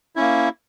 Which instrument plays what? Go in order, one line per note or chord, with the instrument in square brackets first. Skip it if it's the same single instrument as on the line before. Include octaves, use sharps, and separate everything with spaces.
[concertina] A#3 C#4 E4